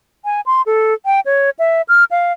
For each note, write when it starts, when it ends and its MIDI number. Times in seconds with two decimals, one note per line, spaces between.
0.25 0.41 80
0.46 0.62 84
0.66 0.94 69
1.06 1.20 79
1.26 1.50 73
1.59 1.82 76
1.89 2.04 89
2.11 2.32 77